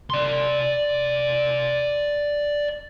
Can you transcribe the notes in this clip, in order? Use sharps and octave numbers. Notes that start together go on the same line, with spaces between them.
D5 C6